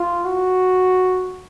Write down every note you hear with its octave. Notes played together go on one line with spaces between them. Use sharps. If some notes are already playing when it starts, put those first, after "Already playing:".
Already playing: F4
F#4